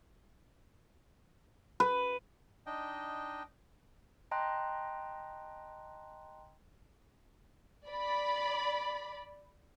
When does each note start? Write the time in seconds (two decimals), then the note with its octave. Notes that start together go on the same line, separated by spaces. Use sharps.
1.80 B4
2.66 D4 D#4 D#5 G5
4.31 D#5 G5 A5 A#5 C6 F#6
7.89 D5 B5